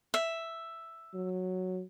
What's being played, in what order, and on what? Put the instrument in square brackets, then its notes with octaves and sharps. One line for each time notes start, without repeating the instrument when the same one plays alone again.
[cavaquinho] E5
[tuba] F#3